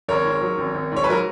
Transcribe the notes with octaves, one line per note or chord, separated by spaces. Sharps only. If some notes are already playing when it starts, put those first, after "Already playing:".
G#1 A#4 C#5
G#2
F#3
G#1
G#1
G#2 C#5
B4
F#3 A#4